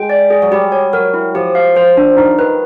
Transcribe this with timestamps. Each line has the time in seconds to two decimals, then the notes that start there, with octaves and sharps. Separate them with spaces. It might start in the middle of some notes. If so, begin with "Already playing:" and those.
Already playing: G#3 G5
0.10 D5
0.30 G#4
0.42 F#3
0.52 G3 G4
0.72 C#5
0.93 F#3 A#4
1.14 E4
1.35 F3 G4
1.55 F5
1.76 F3 C5
1.97 D4
2.17 D#3 D#4
2.38 D#3 B4